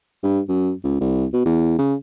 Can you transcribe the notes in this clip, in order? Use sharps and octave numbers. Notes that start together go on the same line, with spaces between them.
G2
F#2
C#2
C2
B2
E2
C#3